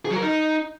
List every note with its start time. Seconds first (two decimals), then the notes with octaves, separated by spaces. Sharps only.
0.05 G#4
0.11 F#3
0.16 A#4
0.22 D#4